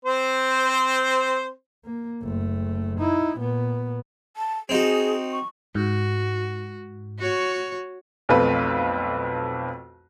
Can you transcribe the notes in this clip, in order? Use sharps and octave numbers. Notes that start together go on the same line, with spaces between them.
C4 C5
A#3
F#1 A3
D#4 E4
A#2 B3
A5
C4 D#4 F#4 G#4
C#6
G#2 F#4
F#4 C#5
B1 F2 A3 C4 B4 F5